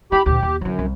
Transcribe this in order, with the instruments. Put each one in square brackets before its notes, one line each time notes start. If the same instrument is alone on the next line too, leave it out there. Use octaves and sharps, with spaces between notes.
[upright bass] E4 [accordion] G4 B5
[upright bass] D2 A#2 [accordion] G4
[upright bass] D#2
[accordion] F#2 [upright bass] D3 E3
[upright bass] C2